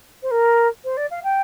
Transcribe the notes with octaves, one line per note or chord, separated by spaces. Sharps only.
C5
A#4
C5
D5
F5
G5